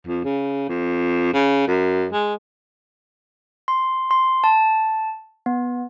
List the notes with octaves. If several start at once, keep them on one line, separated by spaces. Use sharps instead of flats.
F2
C#3
F2
C#3
F#2
G#3
C6
C6
A5
B3